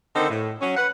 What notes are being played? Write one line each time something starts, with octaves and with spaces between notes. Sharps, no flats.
D3 D#3 C4 D#4 A4
A2
F#3 C#4
B4 F#5